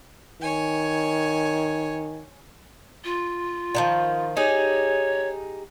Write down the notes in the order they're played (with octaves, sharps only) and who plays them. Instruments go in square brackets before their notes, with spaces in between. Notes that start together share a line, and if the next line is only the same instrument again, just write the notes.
[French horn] D#3 [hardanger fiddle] C#5 G#5
[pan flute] F4
[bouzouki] D3 D#3 F3
[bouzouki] D#4 G4 G#4 [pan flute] C#5